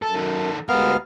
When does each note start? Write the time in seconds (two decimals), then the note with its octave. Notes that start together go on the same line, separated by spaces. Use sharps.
0.02 F#2 A4
0.16 D#3 A4
0.69 D2 G#3 B3 G4 A#4 F5